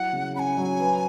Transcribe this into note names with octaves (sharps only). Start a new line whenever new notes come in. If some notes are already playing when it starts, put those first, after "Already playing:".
Already playing: F#3 E4 F#5
C#3
C#4 G#5 B5
F#3
B4